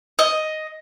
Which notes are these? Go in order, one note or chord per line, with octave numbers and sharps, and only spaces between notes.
D#5